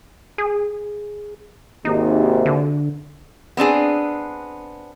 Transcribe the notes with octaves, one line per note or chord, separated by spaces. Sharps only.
G#4
G#1 D#2 C3 D#4
D3
B3 C4 D4 G#4